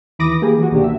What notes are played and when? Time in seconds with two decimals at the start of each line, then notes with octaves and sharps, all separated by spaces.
0.19 D#2 E3 B5 D6 D#6 A#6
0.42 A#3 G4 G#4
0.58 E3 F#4
0.71 C#2 B2 D#3 A#3 D4 G4
0.84 E5